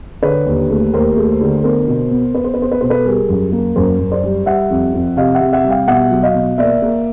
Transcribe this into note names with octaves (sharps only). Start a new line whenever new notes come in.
D3 B4 C#5
D#2
A3
D#2 A#4 C5
A3
D3
B3 A#4 C5
B2
B3
B3 B4
C5
B4
B3 C5
B4
B2 C5
A4 B4
G3 G#4 A#4
F#2
A#3
F#2 A#4 C5
F#2
C5 D5
G3
G3 E5 F#5
F2
F2
C3 D#5 F5
E5 F#5
C3
E5 F#5
G3
F5 G5
B2 E5 F#5
F#3
D#5 F5
B2
A#3 D5 E5
A#3